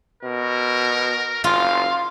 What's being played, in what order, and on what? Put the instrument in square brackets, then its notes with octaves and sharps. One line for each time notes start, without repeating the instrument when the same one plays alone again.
[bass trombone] B2 [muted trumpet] A#4
[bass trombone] F#1 [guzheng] F4 [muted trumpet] F5